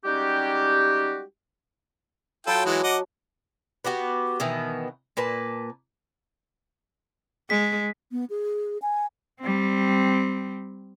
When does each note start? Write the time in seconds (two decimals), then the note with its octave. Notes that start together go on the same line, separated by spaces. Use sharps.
0.05 G3 G#3 C#4 D#4 F#4 G4
2.47 F#3 F4 A4 G5 A5 B5
2.65 E3 G#3 F#4
2.83 D#5 F#5 D6
3.85 B3 F#4 G4 B4
4.40 B2 D#3 E3 B3
5.17 A#2 A#3 B4 A5
7.50 G#3 B6
8.12 B3
8.30 G#4
8.82 G#5
9.41 G3 C4